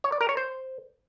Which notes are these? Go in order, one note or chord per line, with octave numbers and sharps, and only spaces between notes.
C#5
D5
A#4
C#5
C5